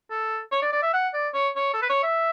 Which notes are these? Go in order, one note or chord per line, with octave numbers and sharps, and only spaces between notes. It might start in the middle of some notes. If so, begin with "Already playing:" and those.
A4
C#5
D5
D5
E5
F#5
D5
C#5
C#5
A4
B4
C#5
E5